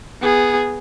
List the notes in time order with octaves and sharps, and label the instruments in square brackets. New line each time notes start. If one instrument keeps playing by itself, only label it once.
[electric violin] B3 G#4